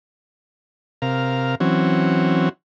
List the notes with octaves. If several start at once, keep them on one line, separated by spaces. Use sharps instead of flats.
C3 A#4 F5
E3 F#3 C4 C#4 F#4